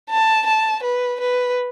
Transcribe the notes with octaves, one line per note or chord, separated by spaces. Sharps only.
A5
A5
B4
B4